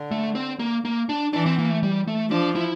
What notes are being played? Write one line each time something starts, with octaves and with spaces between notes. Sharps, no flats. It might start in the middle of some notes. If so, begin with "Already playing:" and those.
Already playing: D3
A3
C4
A#3
A#3
D4
E3 D4
C4
A#3
A3
G3
A3
F3 D4
E4